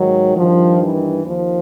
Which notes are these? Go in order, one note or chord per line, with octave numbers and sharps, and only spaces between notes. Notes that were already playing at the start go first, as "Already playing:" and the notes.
Already playing: G#2 D#3 F#3
G2 D#3 F3
E3
D#2 D#3 F3